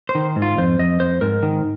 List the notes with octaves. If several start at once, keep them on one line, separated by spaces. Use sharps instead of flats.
C5
D#3
G#2
F4
F2 C5
F2 D#5
F2 C5
G#2 A#4
D#3